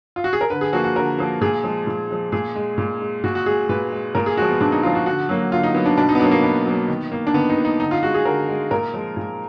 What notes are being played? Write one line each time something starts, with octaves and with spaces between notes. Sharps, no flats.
F4
F#4
G#4
A#4
D3 B4
G#4
F3 A#3 F#4
F#4
D3 A#4
F3 A#3
A#2 G#4
F3 G#3
A#2
F3 G#3
A#2 G#4
G#3
A#2
G#3
A#2 F#4
F#4
G#3 G#4
A#2 B4
G#3
A#2 A#4
G#4
F3 G#3 F#4
B3
A#2 D4
D#4
F3 G#3 F4
F#4
D3 F#4
F#3 A#3
D3 F4
D#4
F#3 A#3 B3
D4
B2 D4
D#4
B3
F#3 A#3 D4
A#3
B2 B3
F#3 A#3
D#3
A#3
D4
D#3 B3
D#4
A#3
D#4
D3 D#4
F4
G#3 F#4
G#4
D3 A#4
G#3
A#2 A#4
F3 G#3
A#2